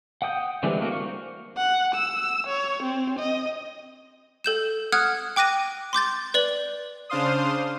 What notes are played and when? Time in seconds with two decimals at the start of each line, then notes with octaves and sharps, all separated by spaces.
0.22 F#5 G5 D#6 G6
0.63 D3 E3 G3 G#3 C4
0.80 A3 A#3 F4 F#4
0.91 A#4 C5 C#6
1.57 F#5
1.95 E6
2.47 C#5
2.83 C4
3.19 D#5
4.44 A4 G6 E7
4.92 F#5 D#6 F6 F#6 G#6
5.36 G5 D6 F#6 A#6 D#7
5.93 C6 D6 G6 A6
6.34 B4 D5 F#7
7.09 C#3 D4 C5 F5 C6 D#6